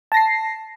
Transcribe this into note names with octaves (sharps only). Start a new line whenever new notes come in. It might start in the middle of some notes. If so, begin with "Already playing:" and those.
A5 A#6 C7